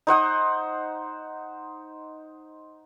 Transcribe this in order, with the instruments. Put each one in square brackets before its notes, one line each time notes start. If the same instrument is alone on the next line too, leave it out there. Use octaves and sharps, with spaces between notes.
[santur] D#4 C5 F#5 D#6